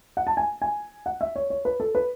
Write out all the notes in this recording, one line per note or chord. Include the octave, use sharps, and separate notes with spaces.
F#5
A5
G#5
G#5
F#5
E5
C#5
C#5
B4
A4
B4